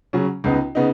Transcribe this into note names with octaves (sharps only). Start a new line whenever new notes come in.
C#3 F#3 C#4
C#2 C#3 B3 D#4
C#3 B3 D#4